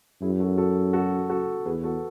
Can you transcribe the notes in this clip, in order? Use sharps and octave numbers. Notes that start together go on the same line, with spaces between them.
F#2 E4 G#4
F#4 A4
F#4 A4
F#4 A4
F#4 A4
E2 G#4 B4
F#4 A4